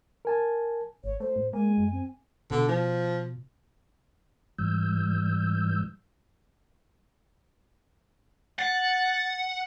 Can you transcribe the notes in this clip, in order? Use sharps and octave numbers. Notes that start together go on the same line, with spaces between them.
A#4 G#5 A5
G#1 C#5
A3 C5
A2
G#3 A#3 G#5
F#2
C4
B2 D3
F3
G#2 E3 G3 E6 G6
F#5 A6